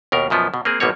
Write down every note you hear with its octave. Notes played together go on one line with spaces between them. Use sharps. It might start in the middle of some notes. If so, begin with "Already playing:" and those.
D#2 B2 A#4
F#2 B2 F3 B3
B2
A#3 C4 G#4
A1 B2 G3 A#3 C#5